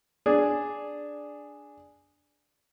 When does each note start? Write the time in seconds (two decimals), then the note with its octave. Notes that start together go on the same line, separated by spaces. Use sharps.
0.26 D4 G#4